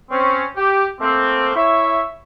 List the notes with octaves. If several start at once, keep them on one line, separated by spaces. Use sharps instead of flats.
C4 C#4
G4
A3 A#3 C4
E4 C#5 E5